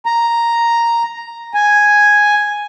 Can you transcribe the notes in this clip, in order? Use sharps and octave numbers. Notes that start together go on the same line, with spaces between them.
A#5
G#5